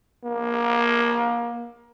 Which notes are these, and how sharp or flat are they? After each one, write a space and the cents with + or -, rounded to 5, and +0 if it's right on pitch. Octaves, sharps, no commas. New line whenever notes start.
A#3 +25